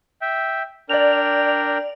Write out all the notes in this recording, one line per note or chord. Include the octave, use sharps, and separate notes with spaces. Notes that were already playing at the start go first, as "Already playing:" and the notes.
E5 G5
D4 A#4 D5 G5 F7